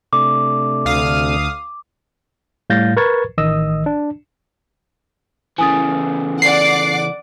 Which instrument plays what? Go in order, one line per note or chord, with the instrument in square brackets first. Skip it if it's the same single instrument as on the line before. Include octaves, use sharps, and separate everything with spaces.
[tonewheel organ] C3 A3 D4 [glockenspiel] D6
[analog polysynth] D2 F5 D#6
[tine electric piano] A2 G3 F5 G6 A6 A#6
A#4 B4 C#6 G#6 A6
A1 D#3 D#5 D#6 E6
D4
[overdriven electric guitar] C#3 E3 [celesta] G#5 D#6 A6
[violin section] D5 F#5 D6 [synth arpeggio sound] C7